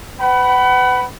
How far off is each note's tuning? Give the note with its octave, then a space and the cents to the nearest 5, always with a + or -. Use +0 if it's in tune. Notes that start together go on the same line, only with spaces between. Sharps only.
B4 +35 F#5 +35 B5 +0